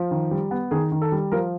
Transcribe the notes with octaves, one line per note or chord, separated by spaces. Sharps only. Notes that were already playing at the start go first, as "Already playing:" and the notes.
Already playing: F3
D#3
G3
B3
D#3 G#4
D#3
A4
G3
F3 A#4